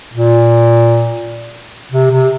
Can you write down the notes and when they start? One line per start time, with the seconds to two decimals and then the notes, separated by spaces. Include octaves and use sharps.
0.13 A#2
1.92 C3
2.11 C3